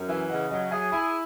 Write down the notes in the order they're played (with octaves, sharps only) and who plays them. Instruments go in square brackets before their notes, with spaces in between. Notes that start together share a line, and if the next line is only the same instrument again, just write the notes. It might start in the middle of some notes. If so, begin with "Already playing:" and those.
Already playing: [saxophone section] F#2
[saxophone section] E3 [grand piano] E5 G#5
[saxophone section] C#3 [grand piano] D#5 F#5
[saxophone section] F#3 [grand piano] D#5 F#5
[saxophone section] G#4 [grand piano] E5 G#5
[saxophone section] E4 [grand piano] G#5 B5